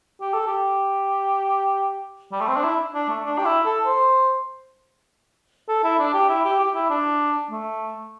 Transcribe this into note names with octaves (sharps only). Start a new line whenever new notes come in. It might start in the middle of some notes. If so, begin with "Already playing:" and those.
G4
A4
G4
G3
A3
C4
D4
E4
D4
A3
D4
G4
E4
A4
C5
A4
E4
D4
G4
E4
G4
G4
E4
D4
A3